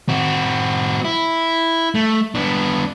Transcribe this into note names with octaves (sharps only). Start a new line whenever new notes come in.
C4 F#4
E4
A3
B3 D4